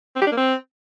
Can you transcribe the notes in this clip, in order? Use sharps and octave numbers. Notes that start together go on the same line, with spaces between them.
C4
G4
D4
A#3
C4